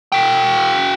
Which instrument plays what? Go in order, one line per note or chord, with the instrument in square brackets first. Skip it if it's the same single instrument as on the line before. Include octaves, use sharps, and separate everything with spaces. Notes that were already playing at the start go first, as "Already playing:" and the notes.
[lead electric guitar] F#4 G5